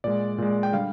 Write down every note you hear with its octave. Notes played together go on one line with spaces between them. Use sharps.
A#2 G#3 D5
A#2 G#3
G5
D3 G3 F5